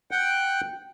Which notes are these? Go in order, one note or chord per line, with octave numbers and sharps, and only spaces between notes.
F#5 G5